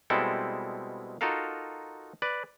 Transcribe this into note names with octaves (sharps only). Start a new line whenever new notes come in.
B2 G3 G#3 C4 E4 A4
D#4 F4 F#4 A4 A#4 F5
B4 D5